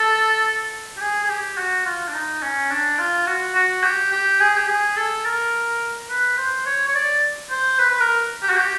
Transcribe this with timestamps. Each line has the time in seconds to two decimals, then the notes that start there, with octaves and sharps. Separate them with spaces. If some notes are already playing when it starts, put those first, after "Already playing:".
Already playing: A4
0.97 G4
1.01 G#4
1.24 G#4
1.29 G4
1.58 F#4
1.85 F4
2.08 D4
2.14 D#4
2.42 C#4
2.71 D4
2.99 F4
3.26 F#4
3.55 F#4
3.83 G4
4.12 G4
4.40 G#4
4.56 G4
4.68 G#4
4.96 A4
5.25 A#4
6.10 B4
6.37 C5
6.66 C#5
6.87 C#5
6.95 D5
7.50 C5
7.79 B4
7.90 B4
8.01 A#4
8.42 G4
8.49 F#4
8.57 G4